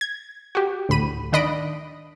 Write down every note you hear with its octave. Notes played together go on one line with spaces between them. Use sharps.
G#6
F#4 G4
D2 A2 B5 D#7
D#3 D4 D#5 B5 D7